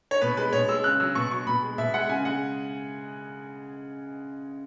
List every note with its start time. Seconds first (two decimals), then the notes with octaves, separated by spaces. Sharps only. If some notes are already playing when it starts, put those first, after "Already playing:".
0.11 C#5
0.21 B2 B4
0.37 G#3 B4
0.53 B2 C#5
0.68 G#3 E6
0.84 C#3 F#6
1.00 F#3 E6
1.15 B2 C#6
1.31 F#3 C#6
1.47 B2 B5
1.63 G#3
1.78 B2 E5
1.94 G#3 F#5
2.09 C#3 G#5
2.25 G#3 F#5